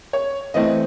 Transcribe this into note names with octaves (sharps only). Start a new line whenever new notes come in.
C#5
E3 A3 C4 D#5